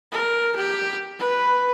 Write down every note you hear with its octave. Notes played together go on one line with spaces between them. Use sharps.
A#4
G4
B4